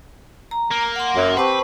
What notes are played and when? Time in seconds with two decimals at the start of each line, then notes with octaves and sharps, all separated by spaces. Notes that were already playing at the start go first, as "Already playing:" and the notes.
0.51 A#5
0.72 A#3
0.96 F#5 C6
1.16 F#2
1.37 C4 G4 B4 C5 A5 C#6